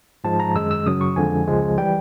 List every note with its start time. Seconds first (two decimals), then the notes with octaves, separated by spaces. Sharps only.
0.24 G#2 F3 G#3 A5
0.40 A#5
0.55 F#2 D#3 G#3 E6
0.71 E6
0.86 F#2 C#3 F#3 D#6
1.01 C#6
1.16 F2 D3 F3 G#3 G#5
1.47 C#2 C#3 F3 G#3
1.78 E3 G3 G5